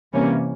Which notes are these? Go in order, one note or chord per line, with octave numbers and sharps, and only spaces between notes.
C3 E3 G3 A#3 C#4